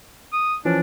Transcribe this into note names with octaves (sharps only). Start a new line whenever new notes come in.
D#6
E3 F3 C#4 D4